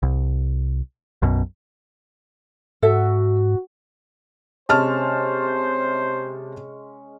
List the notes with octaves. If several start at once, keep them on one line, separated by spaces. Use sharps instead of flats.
C2
B1 F#2 B2
G#2 F#4 A4 E5
C3 G#3 C#4 C5 A5 F6